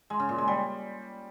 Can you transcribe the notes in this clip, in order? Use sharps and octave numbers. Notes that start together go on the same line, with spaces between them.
G#3
C#3
A#2
G#3
G3